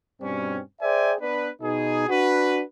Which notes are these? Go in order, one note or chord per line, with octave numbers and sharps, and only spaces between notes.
G2 B2 G3 C4 C#4
G#4 C5 D5 E5 G5 G#5
B3 D4 B4
B2 D#4 G#4
D4 F#4 B4